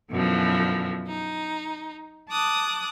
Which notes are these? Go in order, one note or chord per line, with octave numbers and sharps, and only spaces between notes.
F#2 B2 D3 E3 F3
D#4
A5 D6 D#6 F#6